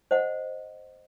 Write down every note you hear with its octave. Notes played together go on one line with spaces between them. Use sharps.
C5 D#5 F#5